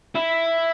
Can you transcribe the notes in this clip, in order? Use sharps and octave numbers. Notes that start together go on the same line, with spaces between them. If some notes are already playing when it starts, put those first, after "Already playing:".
E4